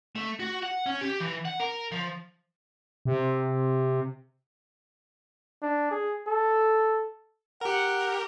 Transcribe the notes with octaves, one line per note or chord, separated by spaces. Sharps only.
A3
F#4
F#5
C#4
G4
E3
F#5
A#4
F3
C3
D4
G#4
A4
G4 A#4 F#5